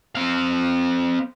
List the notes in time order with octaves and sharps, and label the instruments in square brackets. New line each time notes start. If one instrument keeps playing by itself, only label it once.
[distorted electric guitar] C4 F5